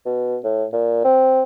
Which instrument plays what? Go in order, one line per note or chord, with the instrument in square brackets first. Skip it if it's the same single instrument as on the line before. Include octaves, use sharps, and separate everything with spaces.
[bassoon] B2
A2
A#2
C4